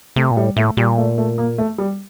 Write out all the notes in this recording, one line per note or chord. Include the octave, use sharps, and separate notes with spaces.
C3 A3
A#2
A2 G3
A2 A3
A#2 G3
A3
A3
A#3
A3
G3